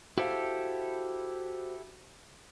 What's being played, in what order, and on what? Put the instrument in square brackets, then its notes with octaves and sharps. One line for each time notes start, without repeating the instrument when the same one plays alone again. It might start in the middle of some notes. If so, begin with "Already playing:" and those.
[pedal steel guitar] E4 G4 A4 [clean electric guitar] F#4 C5 F5